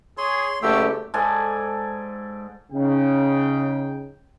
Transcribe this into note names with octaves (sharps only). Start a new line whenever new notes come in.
G#4 C#5 C6
F#1 A3 F#4 G4 E6
G#2 A4 D5 G#5
C#3 D#4 G5